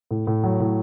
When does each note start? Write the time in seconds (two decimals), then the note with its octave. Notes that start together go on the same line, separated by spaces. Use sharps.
0.11 A2
0.27 A2
0.44 F#3
0.60 A2